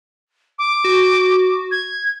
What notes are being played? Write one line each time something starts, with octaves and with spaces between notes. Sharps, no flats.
D6
F#4
G#6